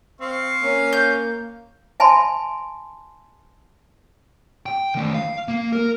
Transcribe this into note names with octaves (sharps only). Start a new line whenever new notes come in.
C4 F5 C#6
A#3 C#4
G6
E5 G#5 A5 B5 C6
G5
D#3 A3
F5
A#3
A#4